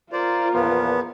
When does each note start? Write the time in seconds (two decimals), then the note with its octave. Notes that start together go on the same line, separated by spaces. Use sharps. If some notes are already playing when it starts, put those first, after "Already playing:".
0.13 F4 A#4 C5 D5
0.54 E2 A#2 F3 B3